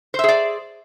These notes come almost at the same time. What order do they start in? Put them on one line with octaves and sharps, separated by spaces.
C5 E5 G#4 D5